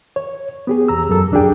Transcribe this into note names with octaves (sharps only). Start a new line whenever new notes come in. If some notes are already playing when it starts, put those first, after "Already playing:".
C#5
B3 G4 G#4
E2 A#5 E6
F#2 F#3 G4 A4 E6
C#2 F#2 D4 G4 G#4 G5